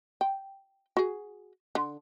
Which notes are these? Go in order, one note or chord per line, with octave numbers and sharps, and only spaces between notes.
G5
F#4 G#4
D3